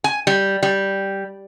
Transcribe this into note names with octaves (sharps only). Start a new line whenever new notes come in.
G#5
G3
G3